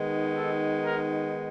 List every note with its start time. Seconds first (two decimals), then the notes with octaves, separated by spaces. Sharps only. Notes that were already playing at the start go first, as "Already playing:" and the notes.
Already playing: D#3 G#3 B3 D#4
0.36 A4
0.84 A#4